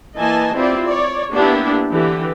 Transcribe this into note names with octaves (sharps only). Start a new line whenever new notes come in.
E3 A#3 D#5 G#5 A5
C4 E4 F4 G4 D5
C#5 D5
A#3 B3 D4 E4 G4
D3 E3 G4